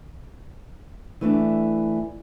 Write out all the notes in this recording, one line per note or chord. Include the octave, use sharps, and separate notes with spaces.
E3 A3 D4